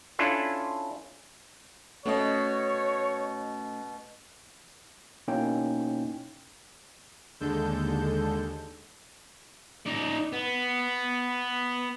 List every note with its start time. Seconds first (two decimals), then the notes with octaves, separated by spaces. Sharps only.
0.19 C#4 D4 E4 F4 A4
2.06 B2 A3 C#4 C#5 D#5
5.28 B2 A#3 C#4 D#4 E4 G5
7.40 D#2 D3 G#3 A4 G6
9.86 D#4 D5
10.33 B3